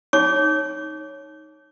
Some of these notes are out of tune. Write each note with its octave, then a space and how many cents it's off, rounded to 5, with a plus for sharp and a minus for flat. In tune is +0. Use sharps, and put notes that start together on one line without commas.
D#4 +0 C#5 -5 D6 -30